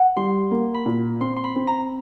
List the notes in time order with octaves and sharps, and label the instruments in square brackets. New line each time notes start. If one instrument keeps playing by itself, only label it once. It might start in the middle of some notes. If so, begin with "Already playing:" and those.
Already playing: [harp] F#5
[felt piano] G3 [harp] C6
[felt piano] A#3
[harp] B5
[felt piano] A#2
[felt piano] C4 [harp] C6
[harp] C6
B5
[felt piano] C4
[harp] A#5